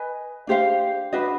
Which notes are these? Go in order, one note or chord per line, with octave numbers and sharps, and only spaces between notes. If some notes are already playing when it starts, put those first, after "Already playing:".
Already playing: B4 D#5 G#5
D4 G4 C5 F5
D4 F#4 B4 D#5